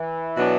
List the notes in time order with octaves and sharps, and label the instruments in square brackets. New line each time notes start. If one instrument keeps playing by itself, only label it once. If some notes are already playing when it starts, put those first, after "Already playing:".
Already playing: [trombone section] E3
[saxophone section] B2 F#3 B3 D4